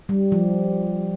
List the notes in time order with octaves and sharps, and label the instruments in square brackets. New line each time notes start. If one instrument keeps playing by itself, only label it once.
[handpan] G3
F3